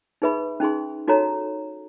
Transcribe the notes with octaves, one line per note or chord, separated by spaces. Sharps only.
D#4 G#4 B4 E5 B5
C#4 D#4 G#4 C6
D#4 F#4 A4 C#5 A#5